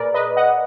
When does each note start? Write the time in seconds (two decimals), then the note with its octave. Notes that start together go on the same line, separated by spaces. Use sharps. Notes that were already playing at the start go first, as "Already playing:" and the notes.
Already playing: A#2 G#4 A#4 B4 D5
0.14 B4 D#5
0.36 D#5 F#5